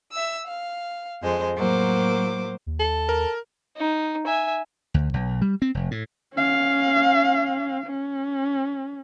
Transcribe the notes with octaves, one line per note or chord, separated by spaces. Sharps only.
E5 E6
F5
F2 G#3 C5
A2 F#3 A#3 C5 D6
D#2
A4
A#4
D#4
E5 G#5
D2
B1
G3
C4
F1
A2
C#4 F5
C#4